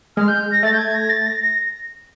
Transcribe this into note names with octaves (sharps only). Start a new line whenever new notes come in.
G#3 F6
G6
A#6
A3 A6
G6
G#6
A#6
A6
A#6
A#6